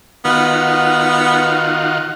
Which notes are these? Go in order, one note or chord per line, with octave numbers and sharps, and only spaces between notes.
D#3 B3 F4 F#4